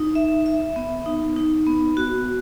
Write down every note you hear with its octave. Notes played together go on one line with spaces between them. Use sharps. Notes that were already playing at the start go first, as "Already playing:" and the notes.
Already playing: D#4
E5
E5
B3
D#4
D#4
B3
F#4